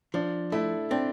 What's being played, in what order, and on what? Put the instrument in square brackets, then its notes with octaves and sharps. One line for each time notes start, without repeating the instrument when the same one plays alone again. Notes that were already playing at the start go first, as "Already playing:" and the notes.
[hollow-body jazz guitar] F3 [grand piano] D4
[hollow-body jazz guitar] A3 [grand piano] E4
[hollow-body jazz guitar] C4 [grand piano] D4